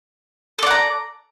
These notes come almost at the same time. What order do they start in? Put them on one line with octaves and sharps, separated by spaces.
A4 D5 F#5 A#5